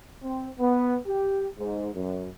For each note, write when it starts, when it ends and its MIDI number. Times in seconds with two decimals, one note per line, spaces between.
0.22 0.49 60
0.59 0.96 59
1.07 1.47 67
1.59 1.90 44
1.94 2.28 42